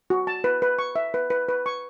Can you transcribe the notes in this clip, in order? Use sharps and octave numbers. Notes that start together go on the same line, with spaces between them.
F#4
A5
B4
B4
C#6
E5
B4
B4
B4
C#6